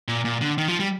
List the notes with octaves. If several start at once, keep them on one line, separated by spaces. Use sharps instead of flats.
A#2
A#2
D3
D#3
F3
G3